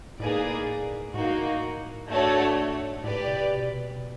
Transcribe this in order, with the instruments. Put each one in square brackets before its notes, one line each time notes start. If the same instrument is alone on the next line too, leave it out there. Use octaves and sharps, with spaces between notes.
[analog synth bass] A2 [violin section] A#3 D#4 G#4 B4 D5
[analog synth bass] A2 [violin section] A#3 D#4 F#4
[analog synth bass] G#2 [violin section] A3 D4 F#4 A4 C#5
[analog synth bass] A2 [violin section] G4 B4 D5
[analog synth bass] C3
B2